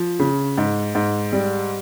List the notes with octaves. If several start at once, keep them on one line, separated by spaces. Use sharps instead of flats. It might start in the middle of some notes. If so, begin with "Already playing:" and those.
Already playing: F3
C#3
G#2
G#2
G3